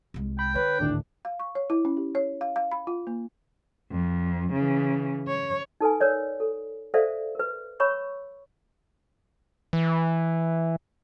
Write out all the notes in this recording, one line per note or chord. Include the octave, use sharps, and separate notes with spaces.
C2 G#3
G5 B5
D3 B4 C#5
G#1 D2 A2 D4
F5
C#6
C#5
E4
C#4
G4
C#5
F5
F5
B5
F4
A#3
F2
C#3 E3
C#5
D#4 A4 B4 G#5
A#4 B4 C#5 D5
A4
A4 C5 D5 E5 F5
A#4 B4
C#5 B5 C#6 E6
E3